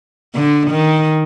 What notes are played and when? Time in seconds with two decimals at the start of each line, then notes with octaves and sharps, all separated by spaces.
0.35 D3
0.71 D#3